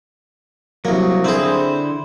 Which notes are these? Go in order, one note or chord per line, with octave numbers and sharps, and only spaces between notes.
C2 F#3 A#3
D3 C4 E4 G#4 C5